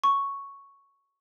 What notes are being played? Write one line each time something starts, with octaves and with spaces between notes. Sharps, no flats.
C#6